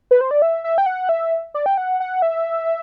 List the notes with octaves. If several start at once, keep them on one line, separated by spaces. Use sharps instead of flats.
B4
C5
D5
E5
E5
G5
F#5
E5
D5
G5
F#5
F#5
E5